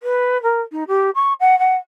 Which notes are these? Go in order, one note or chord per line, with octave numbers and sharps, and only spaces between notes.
B4
A#4
D#4
G4
C#6
F#5
F#5